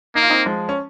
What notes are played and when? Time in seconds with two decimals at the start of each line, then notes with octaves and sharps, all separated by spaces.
0.15 A#3 D#4
0.22 F4
0.30 C4 D#4
0.46 F3 G#3
0.69 C#4